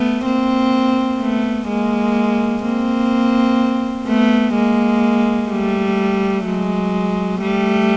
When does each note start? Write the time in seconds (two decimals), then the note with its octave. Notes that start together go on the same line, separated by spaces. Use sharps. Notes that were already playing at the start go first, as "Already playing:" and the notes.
Already playing: A3 B3
0.25 A#3 C4
1.20 A3 B3
1.68 G#3 A#3
2.63 A#3 C4
4.07 A3 B3
4.54 G#3 A#3
5.49 G3 A3
6.45 F#3 G#3
7.41 G3 A3